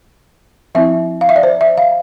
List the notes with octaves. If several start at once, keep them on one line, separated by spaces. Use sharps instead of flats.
F3 C4 E4 E5
F5
E5
D5
C5
E5
F5